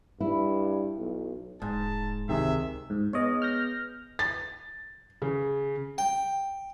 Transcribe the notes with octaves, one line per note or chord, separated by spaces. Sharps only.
G2 E4
B1
D#1 G#2 A5
C#2 C3 D#3 G#4 E5
G#2
B3 G#4 B4 C#5 D#5
F6 G6 A#6
A6
C#3
G5